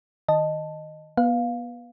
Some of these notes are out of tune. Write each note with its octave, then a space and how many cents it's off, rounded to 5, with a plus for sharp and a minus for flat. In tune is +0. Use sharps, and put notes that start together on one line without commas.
D#3 +0 D#5 -10 A5 +0
B3 -30 B4 +0 F5 +10